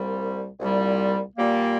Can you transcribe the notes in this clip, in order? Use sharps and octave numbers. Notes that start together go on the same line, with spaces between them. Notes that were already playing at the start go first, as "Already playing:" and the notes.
Already playing: C2 A#2 G3
C2 A#2 G3
A#2 G3 A#3